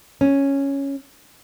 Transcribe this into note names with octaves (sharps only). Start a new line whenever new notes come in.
C#4